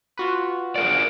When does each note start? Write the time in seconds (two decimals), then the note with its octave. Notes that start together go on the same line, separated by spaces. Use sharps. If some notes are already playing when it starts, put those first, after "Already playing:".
0.17 F4 F#4 B4
0.76 G#4 A#4 D5 D7